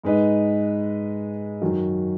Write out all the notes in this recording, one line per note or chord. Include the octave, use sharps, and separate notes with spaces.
G#2 G#3 D#4 B4 D#5
F#2 D#3 F#3